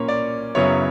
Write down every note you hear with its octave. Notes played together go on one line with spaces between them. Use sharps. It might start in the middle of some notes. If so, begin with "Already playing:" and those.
Already playing: A#2 A#3 C#4 C#5
D5
F#2 C#3 F#3 B3 E4 C#5